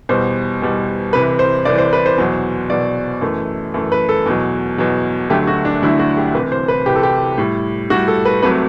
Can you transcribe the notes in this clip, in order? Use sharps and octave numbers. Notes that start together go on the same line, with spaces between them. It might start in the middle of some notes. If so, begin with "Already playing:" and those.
E2 B2 G3 C5
E2 B2 G3
C2 C3 E3 B4
C5
C2 C3 E3 D5
C5
B4
C5
E2 B2 F#3
E2 B2 F#3 D5
F#2 E3 A3
F#2 E3 A3
B4
A4
E2 B2 F#3
E2 B2 F#3
D2 D3 F#3 A3 G4
F#4
D4
D2 D3 F#3 A3 E4
F#4
G4
C2 C3 E3 B4
C5
B4
C2 C3 E3 G4
A4
G4
A2 G3
A2 G3 F#4
A4
B4
C2 C3 F#3 A3 B4